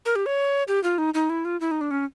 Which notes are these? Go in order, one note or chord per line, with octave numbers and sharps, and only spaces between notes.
A#4
G4
C#5
G4
F4
D#4
D#4
E4
F4
E4
D#4
D4
C#4